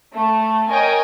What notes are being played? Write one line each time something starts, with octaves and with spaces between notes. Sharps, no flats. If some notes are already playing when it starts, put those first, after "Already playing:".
A3
A#4 C#5 D#5 G5 G#5